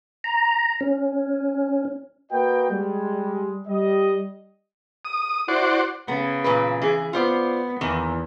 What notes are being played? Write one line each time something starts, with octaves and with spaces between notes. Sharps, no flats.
A#5
C#4
A#3 F#4 B4 D#5 G5
G3 G#3
G3 D#5
D#6
E4 F#4 C5 D5
C#3 B3
A#2 E3 B4
E3 G#4
B3 F4 C5 D5
E2 D#3 E3 A#3